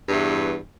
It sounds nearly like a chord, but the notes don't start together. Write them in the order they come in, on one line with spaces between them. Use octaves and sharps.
G2 E2 E3